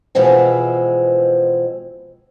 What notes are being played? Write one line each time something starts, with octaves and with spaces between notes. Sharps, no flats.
B2 E3 F3 G#3 C4